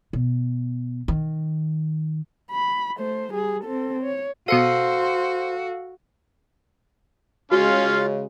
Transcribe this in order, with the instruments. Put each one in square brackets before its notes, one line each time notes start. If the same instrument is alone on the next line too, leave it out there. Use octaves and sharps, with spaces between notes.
[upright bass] B2
D#3
[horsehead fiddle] B5
A3 C5
G3 G#4
C4 A4
C#5
[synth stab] B2 C#7 D#7 [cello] F#4 [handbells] A4 F5 [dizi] C5
[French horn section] C#3 G#3 [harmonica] C#4 F5 C6 [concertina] F4 [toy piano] F#4